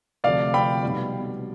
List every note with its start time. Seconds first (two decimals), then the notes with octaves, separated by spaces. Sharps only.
0.24 D2 C3 F3 A3 D5 F5
0.54 G5 B5
0.83 B1 B2 G3